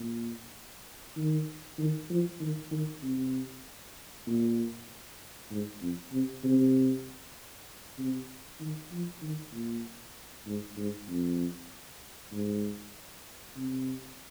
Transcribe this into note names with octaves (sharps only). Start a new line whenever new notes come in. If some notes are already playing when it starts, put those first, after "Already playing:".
Already playing: A#2
D#3
D#3
F3
D#3
D#3
C3
A#2
G#2
F2
C3
C3
C3
D#3
F3
D#3
A#2
G#2
G#2
F2
G#2
C3